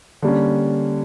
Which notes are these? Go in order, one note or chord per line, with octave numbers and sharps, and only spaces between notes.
D3 G3 A#3 C#4